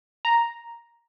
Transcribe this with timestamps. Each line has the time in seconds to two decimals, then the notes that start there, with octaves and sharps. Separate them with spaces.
0.25 A#5